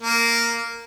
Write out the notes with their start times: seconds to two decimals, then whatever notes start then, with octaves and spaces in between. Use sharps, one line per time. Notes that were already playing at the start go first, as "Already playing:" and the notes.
0.02 A#3